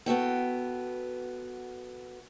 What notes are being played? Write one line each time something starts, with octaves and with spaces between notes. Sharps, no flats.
B3 F#4 A4 G5